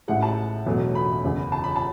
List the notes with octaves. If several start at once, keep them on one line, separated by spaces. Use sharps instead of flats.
A1 A2 E3 G#3 F#5
A5
E1 E2 B2 F#3 A3
B5
F#1 E2 C#3
A5
B5
A5